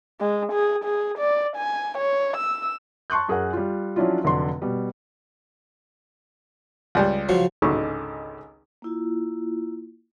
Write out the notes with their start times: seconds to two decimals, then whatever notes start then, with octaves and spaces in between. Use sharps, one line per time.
0.21 G#3
0.53 G#4
0.84 G#4
1.18 D5
1.56 G#5
1.98 C#5
2.37 E6
3.10 A5 C6 C#6 F#6 G6
3.28 F#2 G#4 A#4 F#5
3.53 G3 F4
3.96 F3 F#3 C#4 D4 E4 F4
4.24 F1 D3 F#3 D4 D5 C6
4.62 B2 G3
6.95 C#2 G3 G5
7.29 C#3 F3 F#3
7.62 G#1 C#2 D3 D#3 C#6 D6
8.82 A#3 E4 F4